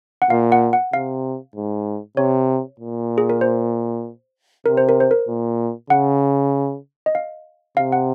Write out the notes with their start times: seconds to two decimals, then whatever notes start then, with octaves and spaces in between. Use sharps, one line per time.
0.22 F#5
0.30 A#2 F5
0.52 F#5
0.73 F#5
0.93 C3 F5
1.56 G#2
2.17 C3 C#5
2.80 A#2
3.18 G#4
3.30 A#4
3.41 C5
4.66 C3 A#4
4.77 C5
4.89 A#4
5.00 C5
5.11 A#4
5.28 A#2
5.90 C#3 F#5
7.06 D#5
7.15 F5
7.77 C3 F5
7.92 F#5